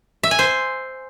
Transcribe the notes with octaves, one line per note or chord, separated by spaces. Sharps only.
E5
G#5
C5